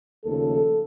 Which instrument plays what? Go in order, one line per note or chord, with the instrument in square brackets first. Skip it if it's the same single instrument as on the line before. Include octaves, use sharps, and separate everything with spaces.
[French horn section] D#2 C#3 F3 A3 A4